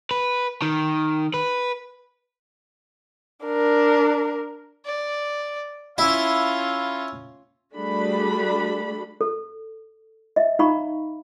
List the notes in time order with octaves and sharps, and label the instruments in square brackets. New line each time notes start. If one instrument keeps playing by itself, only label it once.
[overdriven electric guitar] B4
D#3
B4
[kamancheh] D4 A#4
[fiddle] D5
[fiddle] C#4 F4 [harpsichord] E4 [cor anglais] F5
[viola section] G3 A3 D4 F#4 G#4 B5
[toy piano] A4
D#5 E5
D#4 F5 A#5 B5 C#6